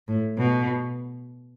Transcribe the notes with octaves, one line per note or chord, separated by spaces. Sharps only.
A2
B2